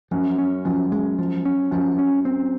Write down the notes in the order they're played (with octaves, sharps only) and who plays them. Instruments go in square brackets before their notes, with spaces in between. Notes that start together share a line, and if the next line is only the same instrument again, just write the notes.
[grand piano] F#2 [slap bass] F3
[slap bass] C#4
[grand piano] F#2 [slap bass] F3
[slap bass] G#3
F3
C#4
[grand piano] F#2 [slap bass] F3
[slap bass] C#4
C4